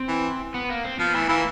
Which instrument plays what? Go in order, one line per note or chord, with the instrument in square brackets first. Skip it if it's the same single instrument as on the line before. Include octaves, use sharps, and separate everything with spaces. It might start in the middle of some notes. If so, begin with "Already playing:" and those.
Already playing: [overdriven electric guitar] C4
[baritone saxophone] E3
[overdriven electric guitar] B3
A#3
C4
[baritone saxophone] F3 [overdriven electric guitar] B3
[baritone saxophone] E3 [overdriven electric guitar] A3
[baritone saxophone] E3 [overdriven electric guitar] A#3